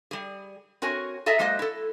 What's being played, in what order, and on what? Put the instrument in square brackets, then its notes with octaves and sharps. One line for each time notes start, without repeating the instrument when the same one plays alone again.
[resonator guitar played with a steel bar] G3 G#4
C4 F#4 A#4 C#5 G#5
G#4 A4 D#5 E5 A#5
F#3 G#3 A#3 C5 D#5
E4 A4